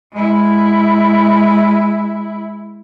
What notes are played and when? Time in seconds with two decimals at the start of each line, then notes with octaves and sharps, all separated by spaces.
0.12 G#3 E4